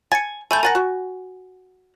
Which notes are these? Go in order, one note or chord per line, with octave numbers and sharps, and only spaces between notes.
G#5 A6 C#7
A3 G#5 B5 G6
A#4 F#5 G#5 A6 A#6
F#4